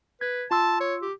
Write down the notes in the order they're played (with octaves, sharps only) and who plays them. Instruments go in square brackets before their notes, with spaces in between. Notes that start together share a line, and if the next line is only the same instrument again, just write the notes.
[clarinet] B4 [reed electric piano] G#6
[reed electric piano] F4 C6 E6 [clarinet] A5
[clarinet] C#5
G4